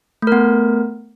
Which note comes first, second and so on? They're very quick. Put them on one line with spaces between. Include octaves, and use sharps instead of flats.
A3 A#4 B3